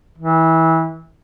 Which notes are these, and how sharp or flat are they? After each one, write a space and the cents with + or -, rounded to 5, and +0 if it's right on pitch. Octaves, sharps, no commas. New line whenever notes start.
E3 -25